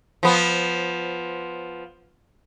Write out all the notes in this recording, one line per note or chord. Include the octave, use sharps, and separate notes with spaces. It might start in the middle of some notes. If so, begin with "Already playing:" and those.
F3 B3